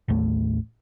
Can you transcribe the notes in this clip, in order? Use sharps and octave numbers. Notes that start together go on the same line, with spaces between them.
A1 D#2 A2 A3